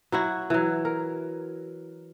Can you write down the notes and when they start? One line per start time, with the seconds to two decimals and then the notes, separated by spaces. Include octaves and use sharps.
0.12 F#3 E4 F#4
0.50 E3 F#3
0.85 A#4